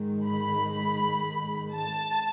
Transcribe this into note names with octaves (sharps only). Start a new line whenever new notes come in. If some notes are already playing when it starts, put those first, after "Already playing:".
Already playing: G#2 D#3 G#3
B5
A5